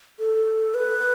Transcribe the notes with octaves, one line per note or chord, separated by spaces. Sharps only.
A4
B4